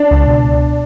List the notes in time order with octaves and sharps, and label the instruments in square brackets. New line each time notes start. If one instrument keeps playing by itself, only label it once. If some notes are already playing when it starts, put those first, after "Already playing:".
Already playing: [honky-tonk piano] D4
[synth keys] C#2
B2